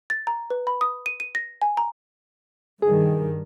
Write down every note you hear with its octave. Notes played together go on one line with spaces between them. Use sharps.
A6
A#5
B4
B5
D#6
D#7
D#7
A#6
G#5
A#5
G2 D#3 G#4